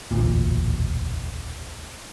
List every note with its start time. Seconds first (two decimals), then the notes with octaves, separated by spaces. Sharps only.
0.11 E1 A1 D2 A#2